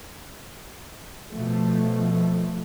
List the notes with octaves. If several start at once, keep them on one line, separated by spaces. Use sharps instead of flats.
B2 F3 A3